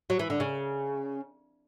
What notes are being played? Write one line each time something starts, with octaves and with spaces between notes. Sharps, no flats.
F#3
E3
D3
C#3